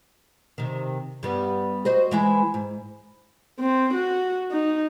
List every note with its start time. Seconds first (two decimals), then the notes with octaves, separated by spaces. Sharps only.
0.58 C3 D#3
1.23 G2 G3 B3
1.85 F#4 C5 D#5
2.11 E3 G#3 E4
2.54 G#2
3.60 C4
3.94 F#4
4.52 D#4